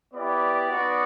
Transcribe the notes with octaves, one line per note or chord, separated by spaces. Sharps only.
B3 E4 G4 D5
B3 D#4 F#4